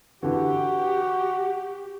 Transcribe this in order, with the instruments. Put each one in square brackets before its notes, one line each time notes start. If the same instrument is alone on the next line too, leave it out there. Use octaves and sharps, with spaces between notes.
[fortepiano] D3 E3 [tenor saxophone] F#4 [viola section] G4